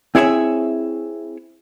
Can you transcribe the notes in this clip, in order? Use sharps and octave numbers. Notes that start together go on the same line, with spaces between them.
C4 E4 G#4 C#5 E5 G#5